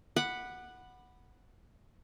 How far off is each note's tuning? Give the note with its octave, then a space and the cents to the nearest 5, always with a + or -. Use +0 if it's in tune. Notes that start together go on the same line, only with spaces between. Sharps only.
F#5 +0 B5 +0 D6 +40